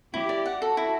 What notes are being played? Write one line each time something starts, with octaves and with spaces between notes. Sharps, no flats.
E4 G4
D5
F#5
F#4 A4
E4